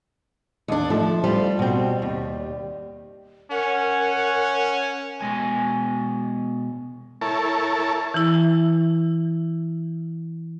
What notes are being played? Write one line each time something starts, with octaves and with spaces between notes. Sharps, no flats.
D#2 D4
F3 A3
G3 F4 C5
B2 C4
D#2
C#4 A#4 F#5
B2 G#3 G#5
E4 A4 A#4 C#5 A5
E3 E4